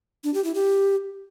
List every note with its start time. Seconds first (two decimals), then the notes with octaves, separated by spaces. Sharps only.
0.24 D4
0.34 G4
0.44 E4
0.55 G4